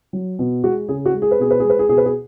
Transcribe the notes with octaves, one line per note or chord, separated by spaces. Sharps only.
F#3
B2
G#3 F#4
C#3 G#4
F#4
G#3
G#4
B4
B2 G#4
B4
G#3 G#4
B4
G#4
B2 G#4
B4
G#4